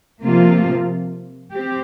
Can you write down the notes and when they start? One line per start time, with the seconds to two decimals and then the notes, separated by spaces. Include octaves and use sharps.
0.22 C3 F3 A#3 F4
1.52 C4 G4